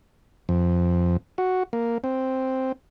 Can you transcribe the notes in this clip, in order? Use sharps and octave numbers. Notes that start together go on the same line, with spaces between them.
F2
F#4
A#3
C4